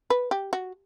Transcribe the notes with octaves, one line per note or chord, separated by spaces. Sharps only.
B4
G4
F#4